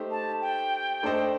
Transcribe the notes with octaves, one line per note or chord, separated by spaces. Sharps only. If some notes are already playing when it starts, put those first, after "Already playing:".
Already playing: A3 D#4 G4 C5
A5
G5
A3 D4 A4 C5 D#5